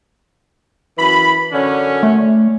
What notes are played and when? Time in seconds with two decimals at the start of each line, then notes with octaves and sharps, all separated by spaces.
0.98 F#2 E3 B5
1.52 F#2 D3 C#4
2.03 A3